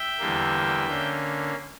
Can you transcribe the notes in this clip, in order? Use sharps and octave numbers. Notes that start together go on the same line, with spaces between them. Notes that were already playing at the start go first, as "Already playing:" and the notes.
Already playing: E5 G5
E2 D3 G3 A#3
D3 A#3 C#4